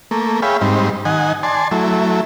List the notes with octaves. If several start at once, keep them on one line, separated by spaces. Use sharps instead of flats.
A3 A#3
G#4 C#5 E5 F5 G5 B5
G#2 G3 C4 D#4
D#3 D#5 F#5 G#5
D5 G#5 A5 C6
F#3 A3 E4